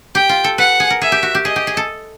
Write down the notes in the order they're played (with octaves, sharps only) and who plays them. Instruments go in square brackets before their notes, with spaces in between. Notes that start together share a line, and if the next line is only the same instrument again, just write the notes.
[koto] G4 [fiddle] G5
[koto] F4
A4
[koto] B4 [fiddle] F#5
[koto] G#4
A#4
[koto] G#4 [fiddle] E5
[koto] G4
F#4
G4
[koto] G#4 [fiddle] D#5
[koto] G4
G#4
A4